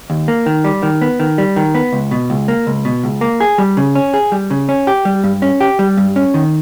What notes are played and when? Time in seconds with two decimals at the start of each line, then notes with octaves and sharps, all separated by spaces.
0.10 D#2
0.28 A#3
0.46 D#3
0.64 G3
0.83 D#3
1.01 B3
1.20 D#3
1.38 G3
1.56 D#3
1.75 B3
1.93 C#2
2.11 B2
2.30 C#2
2.48 A#3
2.67 C#2
2.85 B2
3.04 C#2
3.21 A#3
3.41 G#4
3.58 G3
3.77 C#3
3.95 C#4
4.14 G#4
4.32 G3
4.50 C#3
4.69 C#4
4.87 G4
5.05 G3
5.24 G2
5.42 C#4
5.61 G4
5.79 G3
5.97 G2
6.16 C#4
6.34 D#3